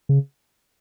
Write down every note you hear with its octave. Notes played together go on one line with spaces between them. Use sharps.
C#3